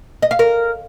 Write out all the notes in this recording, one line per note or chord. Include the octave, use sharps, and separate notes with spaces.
D#5
F5
A#4